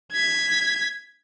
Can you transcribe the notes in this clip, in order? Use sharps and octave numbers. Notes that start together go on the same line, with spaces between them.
G#6 B6